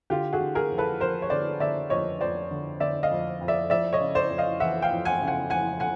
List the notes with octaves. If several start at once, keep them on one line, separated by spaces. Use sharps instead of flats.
D3 F4 G4
F#4 G#4
D3
G#4 A#4
F2
A4 B4
F2 A#4 C5
C#5
D3 C5 D5
D3 D5 E5
F2 C#5 D#5
F2 C5 D5
D3
D3 D5 E5
D#5 F5
F2
F2
D5 E5
F2 D5 E5
C#5 D#5
C#3
C5 D5
F2
D#5 F5
E3 E5 F#5
F5 G5
F2
F#5 G#5
C#3
F#5 G#5
F2 F#5 G#5
F#5 G#5